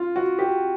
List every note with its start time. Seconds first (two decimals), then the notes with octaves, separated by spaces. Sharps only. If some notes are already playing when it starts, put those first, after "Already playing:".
Already playing: F4
0.16 F#4
0.39 G4